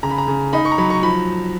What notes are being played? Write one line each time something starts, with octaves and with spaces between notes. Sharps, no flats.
C#3 A#5
B5
A#5
C#3
D#4 B5
C#6
A#5
F#3 B5
C#6
F3 B5